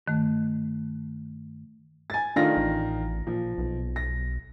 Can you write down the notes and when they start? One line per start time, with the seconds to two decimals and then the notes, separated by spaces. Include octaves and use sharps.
0.06 G2 D#3 A3
2.10 G#5 A6
2.36 D#3 A3 D4 F4 F5 A#6
2.57 A1
3.27 A#2 F3
3.58 B1
3.96 A#6